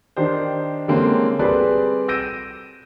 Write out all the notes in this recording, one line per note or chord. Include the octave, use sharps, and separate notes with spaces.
D#3 D4 G4 C5
D3 G3 G#3 A#3 C4 C#4
G3 C4 G#4 A4 B4 D5
E6 G6 A#6 D7 D#7